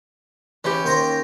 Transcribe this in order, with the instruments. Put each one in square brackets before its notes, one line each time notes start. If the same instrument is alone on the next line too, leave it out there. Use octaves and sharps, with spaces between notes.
[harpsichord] E3 [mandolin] C#4 G4
[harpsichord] D#2 C5 A#5